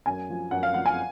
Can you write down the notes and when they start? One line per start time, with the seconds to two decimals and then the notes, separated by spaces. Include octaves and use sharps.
0.06 F#2 G#5
0.30 F3
0.51 F#2 F#5
0.63 F5
0.74 F3 F#5
0.86 G#5